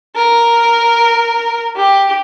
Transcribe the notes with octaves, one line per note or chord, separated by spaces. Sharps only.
A#4
G4